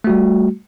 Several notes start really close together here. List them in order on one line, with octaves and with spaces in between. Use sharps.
A3 F#4 G3